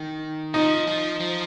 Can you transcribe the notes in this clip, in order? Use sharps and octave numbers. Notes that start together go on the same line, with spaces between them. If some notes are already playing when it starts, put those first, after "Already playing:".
Already playing: D#3
F3 D#4
F3
F3